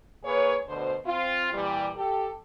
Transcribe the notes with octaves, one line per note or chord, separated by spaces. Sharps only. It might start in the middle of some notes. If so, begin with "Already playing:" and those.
A#3 G#4 B4 C#5
D2 B2 D3 C5
C4 F4
A#2 E3 G3
G4 A4